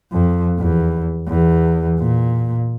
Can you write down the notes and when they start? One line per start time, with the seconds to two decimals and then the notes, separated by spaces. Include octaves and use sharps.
0.12 F2
0.59 E2
1.28 E2
1.99 A#2